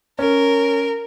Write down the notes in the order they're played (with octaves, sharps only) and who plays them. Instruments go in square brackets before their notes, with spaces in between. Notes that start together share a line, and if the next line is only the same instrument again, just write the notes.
[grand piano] C#4 [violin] A#4